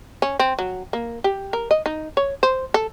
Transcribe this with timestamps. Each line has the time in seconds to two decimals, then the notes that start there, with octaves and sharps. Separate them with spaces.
0.22 C#4
0.40 C4
0.59 F#3
0.93 A#3
1.24 G4
1.53 A#4
1.71 D#5
1.86 D#4
2.17 C#5
2.43 C5
2.74 A4